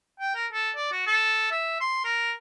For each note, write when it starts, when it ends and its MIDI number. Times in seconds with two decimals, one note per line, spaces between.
0.20 0.35 79
0.35 0.46 70
0.52 0.70 69
0.76 0.90 74
0.92 1.06 66
1.07 1.50 69
1.51 1.76 76
1.81 2.04 84
2.04 2.32 70